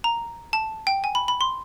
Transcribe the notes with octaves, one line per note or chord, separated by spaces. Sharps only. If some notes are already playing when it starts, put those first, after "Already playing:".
A#5
A5
G5
G#5
B5
B5
C6